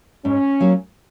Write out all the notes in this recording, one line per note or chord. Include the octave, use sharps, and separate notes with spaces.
G#2 C#4
F#3 A#3